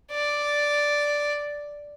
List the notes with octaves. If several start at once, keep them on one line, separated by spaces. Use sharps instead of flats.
D5